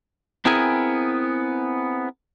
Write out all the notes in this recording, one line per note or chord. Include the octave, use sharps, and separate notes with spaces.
B3 C4 E4 G#4 A#4 G#5